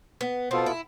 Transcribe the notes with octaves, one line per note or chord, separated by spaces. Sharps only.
B3
B2 B3 C4 F4 A4
E4